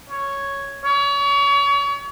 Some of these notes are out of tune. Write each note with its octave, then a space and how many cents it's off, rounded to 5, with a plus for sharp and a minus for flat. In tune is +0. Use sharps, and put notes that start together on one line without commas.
C#5 +0
C#5 +35